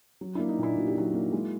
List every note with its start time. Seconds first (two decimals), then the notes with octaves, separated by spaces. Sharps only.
0.21 F#3
0.35 A#3 D4 E4
0.49 D#4
0.58 A#2 D4 E4
0.77 A#2 F#4
0.87 G4
0.95 F#3 E4 F#4
1.14 A#3
1.32 G#3